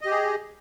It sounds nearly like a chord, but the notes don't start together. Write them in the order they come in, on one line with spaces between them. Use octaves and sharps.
D#5 G4 G#4